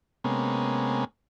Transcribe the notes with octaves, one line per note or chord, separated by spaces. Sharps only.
C3 G#3 A#3 B3 C#4